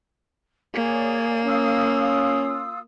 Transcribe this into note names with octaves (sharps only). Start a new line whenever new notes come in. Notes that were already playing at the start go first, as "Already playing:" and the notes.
A#3 G#4 C#5 D5
C#4 F4 D#6 E6